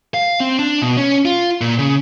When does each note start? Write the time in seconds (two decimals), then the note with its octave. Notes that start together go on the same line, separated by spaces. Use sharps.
0.14 F5
0.40 C4
0.59 D4
0.82 B2
0.97 C#4
1.25 F4
1.61 A#2
1.78 C#3